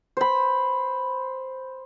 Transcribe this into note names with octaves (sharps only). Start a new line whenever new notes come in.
C5 B5